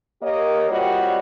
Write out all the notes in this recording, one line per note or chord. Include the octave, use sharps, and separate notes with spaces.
A#3 G4 A#4 C#5 D#5
G3 C4 F4 F#4 C#5 D#5